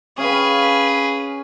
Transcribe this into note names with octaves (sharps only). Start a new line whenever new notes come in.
C#4 G#4 B4 F5 G5